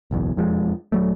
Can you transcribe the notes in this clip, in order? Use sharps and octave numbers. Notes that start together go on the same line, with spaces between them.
F#1 B1 E2
E1 F2 F3 G#3
D#1 F#3 A3